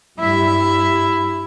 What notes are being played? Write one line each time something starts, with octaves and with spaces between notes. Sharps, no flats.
G2 G3 E4 E5